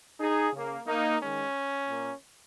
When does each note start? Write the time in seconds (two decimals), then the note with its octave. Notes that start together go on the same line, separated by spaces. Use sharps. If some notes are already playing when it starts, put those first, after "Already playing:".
0.20 D#4 G#4
0.53 C#3 A#3
0.87 A#3 D#4
1.20 D#3 G#3 C#4
1.87 A#2 A#3